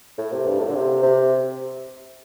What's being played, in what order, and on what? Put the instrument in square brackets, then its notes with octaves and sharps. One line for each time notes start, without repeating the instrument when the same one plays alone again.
[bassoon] A2
C3
G2
A2
D3
C3
C3